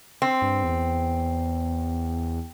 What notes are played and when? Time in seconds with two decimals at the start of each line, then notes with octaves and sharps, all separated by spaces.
0.22 C4
0.42 G2
0.63 E2